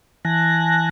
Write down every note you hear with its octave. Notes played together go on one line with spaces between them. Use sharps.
E3 G#5 A5 F#6 A#6